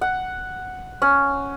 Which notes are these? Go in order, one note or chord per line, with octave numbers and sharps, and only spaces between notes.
F#5
C#4